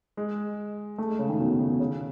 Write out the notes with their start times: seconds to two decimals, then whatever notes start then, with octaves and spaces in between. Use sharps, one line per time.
0.17 G#3
0.98 A3
1.09 G#3
1.19 C#3
1.29 D#3
1.39 B2
1.50 C#3
1.60 C#3
1.70 B2
1.80 C#3